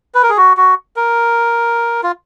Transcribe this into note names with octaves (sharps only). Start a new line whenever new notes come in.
B4
A#4
G#4
F#4
F#4
A#4
F4